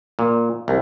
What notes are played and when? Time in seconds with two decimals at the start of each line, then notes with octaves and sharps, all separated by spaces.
0.19 A#2
0.68 C2